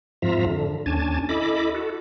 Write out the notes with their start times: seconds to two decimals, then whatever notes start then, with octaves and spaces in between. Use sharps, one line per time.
0.22 F2 G#2 F3 F4 E5 A#5
0.50 D3
0.86 D#2 C#4 D4 G#5 A5
1.29 E4 A4 D#5 B5 D6
1.74 F#4 A4